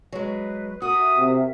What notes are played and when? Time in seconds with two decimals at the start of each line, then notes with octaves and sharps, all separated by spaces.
0.12 F#3 G#3 B4
0.82 F#4 A#4 E5 D#6
1.18 C3